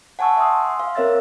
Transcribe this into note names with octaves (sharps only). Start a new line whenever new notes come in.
F#5 G#5 A5 C#6 E6
E5 F#5 G#5 C6 D#6 E6
C6
F5
C4 A#4 C#5 E5 E6 A6